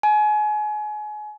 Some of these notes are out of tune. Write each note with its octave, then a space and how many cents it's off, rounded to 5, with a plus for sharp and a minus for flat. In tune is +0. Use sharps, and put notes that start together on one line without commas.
G#5 +30